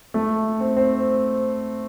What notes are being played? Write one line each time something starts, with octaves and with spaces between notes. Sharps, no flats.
A3
C4
C4